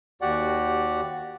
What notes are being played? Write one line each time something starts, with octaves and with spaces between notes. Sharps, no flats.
D#2 F#4 G4 D5 F#5